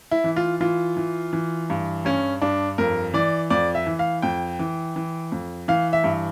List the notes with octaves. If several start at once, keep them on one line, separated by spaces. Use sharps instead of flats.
E4
E3
F4
E3 F4
E3
E3
G2
G2 C#4
G2 D4
F2 A#4
E3 D5
F2 D5
E5
E3
F5
F2 G5
E3
E3
F2
E3 F5
E5
G2